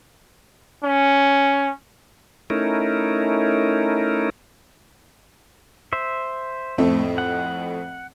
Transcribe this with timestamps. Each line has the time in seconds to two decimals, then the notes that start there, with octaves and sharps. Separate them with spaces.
0.84 C#4
2.50 A3 C#4 D#4 E4 A#4
5.93 C5 E5
6.78 F2 A2 A3 C4
7.18 F#5